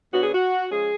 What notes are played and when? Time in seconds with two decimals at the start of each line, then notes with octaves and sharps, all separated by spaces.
0.13 B2 F#3 B3 D4 F#4
0.23 G#4
0.33 F#4
0.71 F3 G#3 C#4 G#4